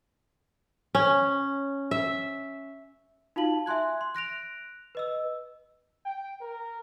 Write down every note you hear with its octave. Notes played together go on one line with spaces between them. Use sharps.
C#4
E5
D#4 F4 F#4 F5 A5 F#7
E5 G#5 C6 F#6 G#6
C6
F#6 A#6 D7 F7
B4 D#5 E6
G5
A#4